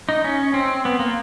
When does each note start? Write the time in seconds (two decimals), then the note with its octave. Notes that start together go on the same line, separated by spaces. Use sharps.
0.09 D#4
0.24 C#4
0.54 C4
0.85 B3
0.99 A#3